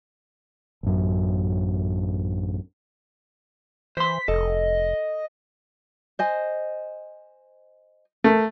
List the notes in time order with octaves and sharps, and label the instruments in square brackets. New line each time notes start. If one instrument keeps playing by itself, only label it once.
[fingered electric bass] A1 F#2
[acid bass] E3 [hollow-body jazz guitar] C5 C6 [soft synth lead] B6
[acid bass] F1 [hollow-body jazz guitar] A4 [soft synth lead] D#5
[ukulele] C5 D#5 G#5
[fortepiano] A3 [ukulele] A#4